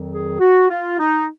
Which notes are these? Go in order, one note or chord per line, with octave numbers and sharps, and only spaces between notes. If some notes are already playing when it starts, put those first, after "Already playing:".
Already playing: F2 D#3 F#3
G#4
F#4
F4
D#4